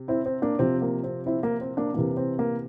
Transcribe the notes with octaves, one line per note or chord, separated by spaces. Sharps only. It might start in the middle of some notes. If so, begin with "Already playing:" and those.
Already playing: C3
C4 E4
C4
A#3 D4
C3 F3 C4
A#3
C4
C4 E4
A#3
C4
A#3 D4
C3 E3 A#3
C4
A#3